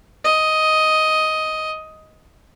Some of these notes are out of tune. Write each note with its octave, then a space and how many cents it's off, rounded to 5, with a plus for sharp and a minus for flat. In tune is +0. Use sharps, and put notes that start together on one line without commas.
D#5 +10